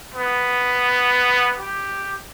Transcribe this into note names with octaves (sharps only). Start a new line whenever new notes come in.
B3
G4